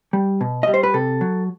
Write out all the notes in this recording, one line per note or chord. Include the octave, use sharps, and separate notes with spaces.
G3
B2
G3 D#5
C5
B4
C3 A4
F#3